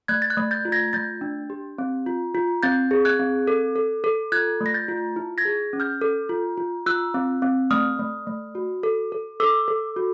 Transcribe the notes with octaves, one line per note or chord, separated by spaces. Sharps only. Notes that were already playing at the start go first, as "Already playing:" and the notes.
A3 F#6 G#6
A6
F#6 G#6
A3
G6 A6
F4
G#6 A#6
A3 G6 A6
D4
G4
C4
F4
F4
C4 G6 A6
G#4
F#6 G#6
C4
A4
A4
A4
F4 F#6 G#6
A3
A#6
G6 A6
F4
E4
G#6 A#6
G#4
C#4
F6 G6
A4
F4
F4
F4 E6 F#6
C4
C4
A3 D#6 F6
A3
A3
F#4
A4
A4
A4 D6 E6
A4
F#4